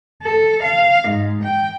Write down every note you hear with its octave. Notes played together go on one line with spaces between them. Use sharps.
A4
F5
G#2
G5